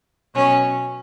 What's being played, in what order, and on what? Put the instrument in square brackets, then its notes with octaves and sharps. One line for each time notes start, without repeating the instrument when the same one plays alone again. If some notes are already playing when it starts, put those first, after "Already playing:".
[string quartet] B2 F#3 C#4